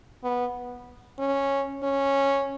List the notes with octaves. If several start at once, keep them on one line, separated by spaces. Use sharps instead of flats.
B3
C#4
C#4